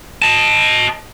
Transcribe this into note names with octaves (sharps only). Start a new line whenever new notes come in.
D#5 A5